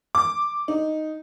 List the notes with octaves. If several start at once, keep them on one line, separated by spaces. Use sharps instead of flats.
D6
D#4